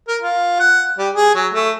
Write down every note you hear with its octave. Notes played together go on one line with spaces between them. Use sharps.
A#4
F4
F#5
G3
G#4
F#3
A3